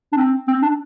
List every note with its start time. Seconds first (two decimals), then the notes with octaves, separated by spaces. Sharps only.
0.12 D4
0.17 C4
0.48 C4
0.62 D4